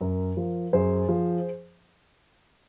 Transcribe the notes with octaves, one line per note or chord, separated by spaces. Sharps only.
F#2 A#4
F3
F#2 G#4 C5
F3